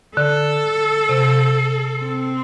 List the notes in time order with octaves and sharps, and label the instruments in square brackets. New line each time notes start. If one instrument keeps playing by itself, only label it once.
[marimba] D3 [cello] A4
[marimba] C3
[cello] C4